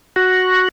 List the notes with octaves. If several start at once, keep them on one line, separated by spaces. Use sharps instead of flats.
F#4